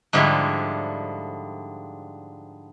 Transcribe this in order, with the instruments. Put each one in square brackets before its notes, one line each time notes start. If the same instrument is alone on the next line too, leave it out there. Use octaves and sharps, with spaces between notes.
[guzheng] G#2 D3 F3 G3 E4